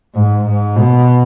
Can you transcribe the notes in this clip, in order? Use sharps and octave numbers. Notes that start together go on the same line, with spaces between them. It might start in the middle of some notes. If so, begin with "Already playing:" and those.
G#2
G#2
B2